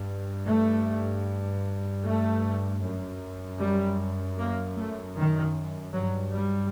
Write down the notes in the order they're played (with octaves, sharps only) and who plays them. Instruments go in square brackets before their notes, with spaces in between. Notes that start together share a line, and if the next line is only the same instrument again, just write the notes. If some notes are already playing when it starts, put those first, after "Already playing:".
Already playing: [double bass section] G2
A3
A3
F#2
G3
A#3
A3
D#3
G2 F#3
G3